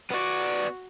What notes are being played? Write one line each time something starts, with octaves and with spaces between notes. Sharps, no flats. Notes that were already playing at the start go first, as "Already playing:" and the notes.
B3 F#4 D5